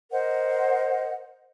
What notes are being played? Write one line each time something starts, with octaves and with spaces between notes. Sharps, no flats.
A#4 C5 D#5 F#5